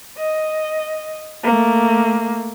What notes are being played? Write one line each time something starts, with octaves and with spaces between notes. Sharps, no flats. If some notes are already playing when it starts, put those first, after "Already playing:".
D#5
A3 A#3